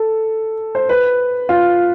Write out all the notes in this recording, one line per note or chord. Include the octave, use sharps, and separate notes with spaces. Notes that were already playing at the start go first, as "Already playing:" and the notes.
Already playing: A4
C5
B4
F4